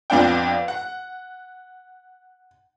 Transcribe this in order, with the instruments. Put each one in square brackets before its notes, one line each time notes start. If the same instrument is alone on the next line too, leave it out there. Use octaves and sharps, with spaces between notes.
[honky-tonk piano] F2 F3 B3 D4 F#5 G5
F#5